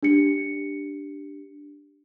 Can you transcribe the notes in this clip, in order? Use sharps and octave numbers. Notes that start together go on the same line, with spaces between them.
D4 G4 C#7